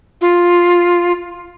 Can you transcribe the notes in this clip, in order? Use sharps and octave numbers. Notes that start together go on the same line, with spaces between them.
F4